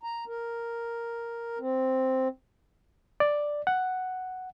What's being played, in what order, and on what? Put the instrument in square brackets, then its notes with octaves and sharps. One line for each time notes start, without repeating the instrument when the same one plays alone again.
[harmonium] A#5
A#4
C4
[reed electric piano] D5
F#5